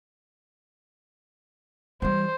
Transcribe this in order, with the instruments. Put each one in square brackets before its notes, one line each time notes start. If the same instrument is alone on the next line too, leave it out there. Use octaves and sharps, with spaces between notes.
[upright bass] E3 G3 [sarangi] C5